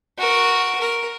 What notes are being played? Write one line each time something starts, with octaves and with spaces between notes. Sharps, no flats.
F#4 A#4
A#4